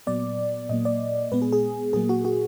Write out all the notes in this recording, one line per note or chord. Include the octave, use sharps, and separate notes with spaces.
A#2 F#3 B3 D5
A#2 F#3 A#3 D#5
D5
A#2 G#3 B3 B4
G#4
G#4
A#2 F#3 A#3 G#4
F#4
F#4